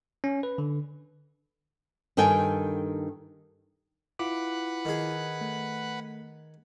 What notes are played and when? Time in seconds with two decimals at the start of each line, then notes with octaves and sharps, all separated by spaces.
0.24 C#4
0.43 B4
0.58 D3
2.17 G2 D#3 A4 G5 G#5
4.19 E4 F4 B4 F#5 D6
4.85 D#3 G#4
5.41 A3